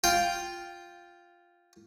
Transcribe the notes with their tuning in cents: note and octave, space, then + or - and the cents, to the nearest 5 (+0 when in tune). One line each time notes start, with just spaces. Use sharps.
F4 +0 G5 +0